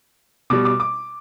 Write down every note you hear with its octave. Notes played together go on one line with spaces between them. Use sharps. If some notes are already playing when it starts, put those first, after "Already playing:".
B2 G3 D6
D6
D6